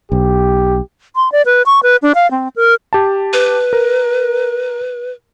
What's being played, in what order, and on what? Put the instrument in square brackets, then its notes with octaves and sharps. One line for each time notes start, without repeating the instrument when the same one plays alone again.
[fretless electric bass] B1 [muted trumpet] G4
[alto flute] C6
D5
B4
C#6
B4
D4
F5
C4
A#4
[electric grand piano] G4 A5
[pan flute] B4
[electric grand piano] A#4